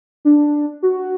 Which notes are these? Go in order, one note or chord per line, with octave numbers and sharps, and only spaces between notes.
D4
F#4